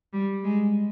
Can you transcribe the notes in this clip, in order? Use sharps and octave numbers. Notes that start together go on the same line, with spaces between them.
G3
G#3